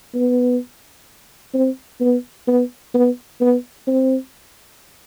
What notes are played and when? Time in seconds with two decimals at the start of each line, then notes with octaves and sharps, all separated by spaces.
0.15 B3
1.54 C4
2.01 B3
2.47 B3
2.94 B3
3.41 B3
3.87 C4